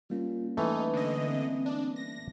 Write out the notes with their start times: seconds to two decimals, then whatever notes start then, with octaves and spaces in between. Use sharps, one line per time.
0.10 G3 A#3 C#4 F4
0.57 E3 A3 D#4 B4
0.93 D3 D#5
1.30 C4
1.66 D4
1.96 A#6